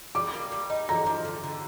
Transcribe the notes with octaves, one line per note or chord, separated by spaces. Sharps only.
G3 D6
A#3
G3
D#4
D3 A#5
F3
D3
D3